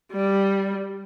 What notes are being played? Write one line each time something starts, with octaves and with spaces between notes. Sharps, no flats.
G3